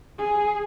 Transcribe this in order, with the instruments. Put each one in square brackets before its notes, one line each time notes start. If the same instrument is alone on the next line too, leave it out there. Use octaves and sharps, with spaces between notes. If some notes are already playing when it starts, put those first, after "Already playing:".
[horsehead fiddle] G#4